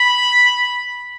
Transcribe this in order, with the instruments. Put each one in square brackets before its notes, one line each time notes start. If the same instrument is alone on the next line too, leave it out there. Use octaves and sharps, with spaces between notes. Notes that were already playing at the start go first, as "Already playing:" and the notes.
Already playing: [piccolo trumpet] B5